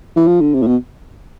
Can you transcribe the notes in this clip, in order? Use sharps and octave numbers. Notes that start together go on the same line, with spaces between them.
E3
F3
D3
C3
A2
B2